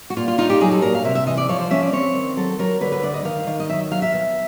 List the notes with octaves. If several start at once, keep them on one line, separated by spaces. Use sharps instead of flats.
F#4
A#2 F4
F4
D#4 F4
G4
F#3 G#4
A4
A#2 A#4
F5
C3 E5
E5
E3 D#5
D5
F3 C#5
C5
C#4 E5
D5
C4 C#5
D#3
F#3 A4
F#3 A#4
D3 B4
B4
D2 D5
D#5
D#3 F5
D#3
D#5
F#3 E5
F#3 F5
E5
B2